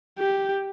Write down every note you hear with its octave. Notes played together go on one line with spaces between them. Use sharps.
G4